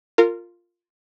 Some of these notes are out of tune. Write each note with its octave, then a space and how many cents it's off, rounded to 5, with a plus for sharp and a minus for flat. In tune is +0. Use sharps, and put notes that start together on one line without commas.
F4 +0 A#4 -25